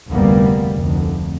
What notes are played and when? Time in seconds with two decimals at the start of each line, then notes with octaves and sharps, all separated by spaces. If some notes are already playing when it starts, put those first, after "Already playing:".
0.12 F1 D2 G3 A#3 B3
0.79 F1 D2